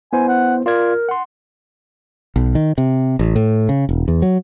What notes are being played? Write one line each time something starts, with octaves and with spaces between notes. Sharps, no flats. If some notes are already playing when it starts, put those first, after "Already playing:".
B3 E4 C5 G#5
F#5
F4 A#4 D5 G#6
F#5 C6
B1
D#3
C3
A1
A2
C#3
E1
E2
F#3